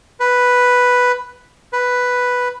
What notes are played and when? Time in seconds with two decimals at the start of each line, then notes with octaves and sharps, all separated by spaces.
0.20 B4
1.73 B4